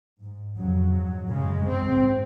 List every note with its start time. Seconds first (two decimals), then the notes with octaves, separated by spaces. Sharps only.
0.20 G#2
0.56 F2 C#3 F#3
0.93 G#2
1.29 F#2 C#3 G#3
1.67 G#2 C4